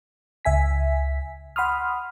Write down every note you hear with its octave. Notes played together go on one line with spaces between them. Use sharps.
C#2 E5 G#5 B6
F#5 B5 C6 D#6 F6